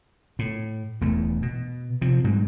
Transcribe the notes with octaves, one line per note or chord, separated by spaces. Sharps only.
A2
E1 E2 A3
B2
C3 F3
G#2 B2 G3